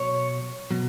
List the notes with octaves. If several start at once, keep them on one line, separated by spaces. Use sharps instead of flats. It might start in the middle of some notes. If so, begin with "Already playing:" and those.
Already playing: B2 F#3 C#5
B2 F#3